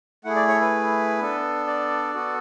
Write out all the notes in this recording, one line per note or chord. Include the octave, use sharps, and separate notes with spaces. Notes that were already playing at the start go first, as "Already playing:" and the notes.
A3 E4 G#4 F#5
D5
C#5
A4
B4
B3 D4 A4
D5
B3 F#4 A4